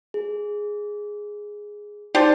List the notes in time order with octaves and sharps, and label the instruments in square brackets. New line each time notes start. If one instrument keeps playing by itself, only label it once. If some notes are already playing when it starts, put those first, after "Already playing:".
[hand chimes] G#4
[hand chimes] D#4 A5 [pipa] G4 C5 D5